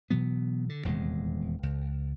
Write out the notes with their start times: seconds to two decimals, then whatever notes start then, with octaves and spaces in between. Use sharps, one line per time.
0.10 B2 E3 F#3 B3
0.69 D3
0.84 D#1 E2 C3 G#3
1.63 C#2